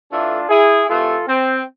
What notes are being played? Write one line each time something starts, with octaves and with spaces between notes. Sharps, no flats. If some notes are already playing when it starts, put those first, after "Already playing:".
A2 E3 A3 D4 F4
E4 G#4
C3 E3 A3 F4 A4
C4